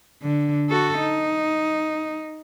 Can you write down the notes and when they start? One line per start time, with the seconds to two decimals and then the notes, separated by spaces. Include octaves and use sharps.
0.23 D3
0.69 F#4 A4
0.99 D#4